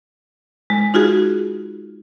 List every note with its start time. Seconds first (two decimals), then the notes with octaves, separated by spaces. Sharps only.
0.70 G#3
0.94 D#4 F4 F#4 G#4